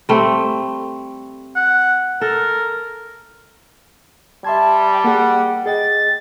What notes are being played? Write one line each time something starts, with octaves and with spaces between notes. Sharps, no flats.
G3 A3 C4
F#5
A4 A#4
G3 E5 A5 C6 G#6
A#3 G#4 F#5
G#4 D#5 G5 A6